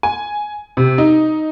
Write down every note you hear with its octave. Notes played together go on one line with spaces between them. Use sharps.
G#5
C3
D#4